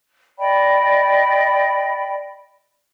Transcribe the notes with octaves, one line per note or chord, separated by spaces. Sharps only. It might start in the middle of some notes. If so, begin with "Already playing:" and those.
D5 D#5 G5 B5